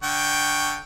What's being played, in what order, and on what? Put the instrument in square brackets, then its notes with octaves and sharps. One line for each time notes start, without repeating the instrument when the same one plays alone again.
[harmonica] D3 G5 C#6